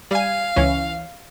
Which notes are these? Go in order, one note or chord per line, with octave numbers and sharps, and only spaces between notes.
G3 F5 G#5
C#2 E3 C#4